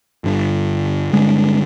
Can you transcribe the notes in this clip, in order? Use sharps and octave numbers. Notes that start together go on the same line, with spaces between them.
G1 G2 D3
G1 G2 D3 G#3